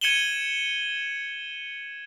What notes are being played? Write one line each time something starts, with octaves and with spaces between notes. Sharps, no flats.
G#6 C#7 D#7 E7 F#7 G7